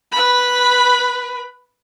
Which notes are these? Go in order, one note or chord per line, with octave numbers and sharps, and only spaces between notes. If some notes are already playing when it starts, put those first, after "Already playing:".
B4 B5